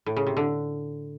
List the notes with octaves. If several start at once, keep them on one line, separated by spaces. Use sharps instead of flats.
A2
C#3
C3
D3